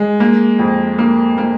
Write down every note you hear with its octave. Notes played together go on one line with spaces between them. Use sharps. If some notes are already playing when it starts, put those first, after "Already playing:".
Already playing: G#3
A#3
F2
A#3
A#3